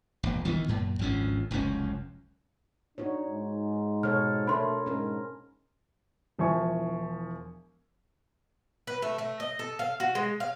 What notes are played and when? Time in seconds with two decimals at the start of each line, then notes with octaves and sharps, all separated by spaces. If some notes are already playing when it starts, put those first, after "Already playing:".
0.23 E1 A#1
0.45 D2 D#3 E3 B3
0.68 F#2 A#2
0.99 G#1 D2 F3 C#4
1.51 F1 C#2 F#2 C#4
2.98 D4 D#4 F#4 C#5
3.28 G#2
4.03 B2 A4 C#5 F6
4.47 A3 D4 A#4 C#5 B5 C6
4.86 G#2 C#4 A#4
6.38 E1 F3 E4 G#5 C#6
8.87 B4
9.02 A3
9.18 A3
9.40 D#5
9.59 A4
9.79 F5
10.00 F#4
10.15 G#3
10.40 F5